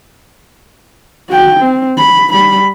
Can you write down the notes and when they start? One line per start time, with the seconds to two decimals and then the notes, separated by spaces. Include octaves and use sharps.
1.29 F#4 G5
1.59 C4
1.97 B5
2.32 G3 B5